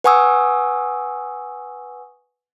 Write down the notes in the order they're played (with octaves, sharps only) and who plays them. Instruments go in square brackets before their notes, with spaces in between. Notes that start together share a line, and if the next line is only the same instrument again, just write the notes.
[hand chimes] B4 F#5 G#5 C#6 D#6 E6